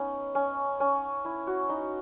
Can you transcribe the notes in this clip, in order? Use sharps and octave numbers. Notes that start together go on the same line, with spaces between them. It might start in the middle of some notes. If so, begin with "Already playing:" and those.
Already playing: B3 C#4 D#4
C#4
C#4
E4
F#4
D#4